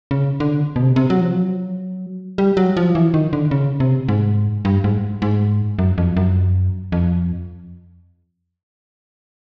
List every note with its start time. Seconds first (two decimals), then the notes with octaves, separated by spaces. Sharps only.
0.11 C#3
0.40 D3
0.76 B2
0.82 C3
0.96 C3
1.10 F#3
1.21 F3
1.31 F#3
2.38 G3
2.57 F#3
2.77 F3
2.95 E3
3.14 D#3
3.33 D3
3.51 C#3
3.80 C3
4.08 G#2
4.65 G2
4.84 G#2
5.22 G#2
5.79 F#2
5.98 F2
6.17 F#2
6.92 F2